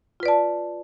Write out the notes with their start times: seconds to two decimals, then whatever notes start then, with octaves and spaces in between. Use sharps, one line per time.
0.20 F4
0.23 B4
0.26 D5
0.28 A5